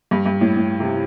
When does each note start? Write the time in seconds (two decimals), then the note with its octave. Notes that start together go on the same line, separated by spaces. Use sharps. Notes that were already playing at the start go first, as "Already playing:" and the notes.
0.11 G2
0.26 G2
0.41 A2
0.56 A2
0.80 C3